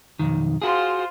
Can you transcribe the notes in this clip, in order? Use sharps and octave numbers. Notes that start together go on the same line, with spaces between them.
B1 F2 D#3
F4 F#4 G#4 C5